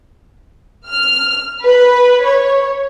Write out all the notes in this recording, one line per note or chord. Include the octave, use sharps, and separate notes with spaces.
F6
B4
C#5